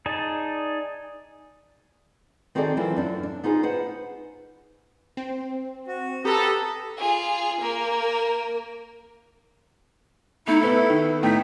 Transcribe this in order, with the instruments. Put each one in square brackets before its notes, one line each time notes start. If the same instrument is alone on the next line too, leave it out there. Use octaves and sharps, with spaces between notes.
[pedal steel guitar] D#4 G#4 D5 A5
[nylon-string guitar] D#3 C4 F#4 G#4 A4 D5
E3 F#3 C4 E4 F4 C5
F#2 D4
D4
B3 D#4 F4 G#4 C5
B4 C5 F#5
[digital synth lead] C4
[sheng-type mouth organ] F#4
[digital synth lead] G4 [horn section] A4 [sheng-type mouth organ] B4 A#5 D#6
[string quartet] F4 G#4
A#3 A#4
[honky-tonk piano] A3 [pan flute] D#4 [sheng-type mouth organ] E4
[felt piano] B3 B4 E5 [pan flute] A4
[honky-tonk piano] D#3
[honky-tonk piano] A2 B6 [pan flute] A3 [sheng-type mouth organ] D#4 [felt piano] G5